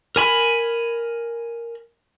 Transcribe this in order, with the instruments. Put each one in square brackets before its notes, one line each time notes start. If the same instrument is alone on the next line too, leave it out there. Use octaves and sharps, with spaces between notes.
[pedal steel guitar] A#4 G#5 B5